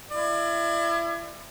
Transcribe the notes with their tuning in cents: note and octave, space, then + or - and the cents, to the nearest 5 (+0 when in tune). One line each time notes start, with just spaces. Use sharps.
E4 +35 D5 +35